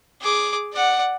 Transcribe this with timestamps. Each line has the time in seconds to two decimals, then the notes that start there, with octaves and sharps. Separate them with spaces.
0.21 G#4 D6
0.73 D5 F#5